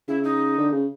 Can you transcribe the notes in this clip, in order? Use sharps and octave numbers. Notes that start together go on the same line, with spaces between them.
C#3 E4
D#4
D3
C#3